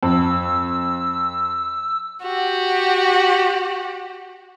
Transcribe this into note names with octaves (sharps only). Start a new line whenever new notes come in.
F2 E6
F#4 G4